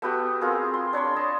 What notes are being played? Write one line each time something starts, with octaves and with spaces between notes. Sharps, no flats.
A3 B3 F#4 G4
C4 F4 G#4 A#4
C6
D4 C#5 B5 C6
D#5 A5